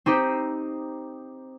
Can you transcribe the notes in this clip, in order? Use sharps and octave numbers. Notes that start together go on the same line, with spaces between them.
C4 D#4 G4 C5